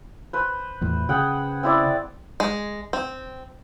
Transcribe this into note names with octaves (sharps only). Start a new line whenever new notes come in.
B4 C5
E2 A2
C#3 G#4 F#5 G5
C4 E4 D5
G#3
C4